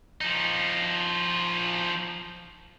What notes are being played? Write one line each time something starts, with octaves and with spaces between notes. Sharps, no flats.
F3 D#4